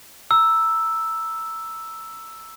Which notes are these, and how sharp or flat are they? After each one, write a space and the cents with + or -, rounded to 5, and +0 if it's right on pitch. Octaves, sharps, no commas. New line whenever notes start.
A#5 +0 E6 +0